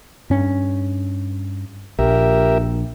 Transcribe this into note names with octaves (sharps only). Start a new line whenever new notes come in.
G2 C#4
A#1 G4 A#4 E5